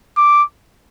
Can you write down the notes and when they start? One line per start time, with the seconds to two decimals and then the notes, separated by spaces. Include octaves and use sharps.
0.17 D6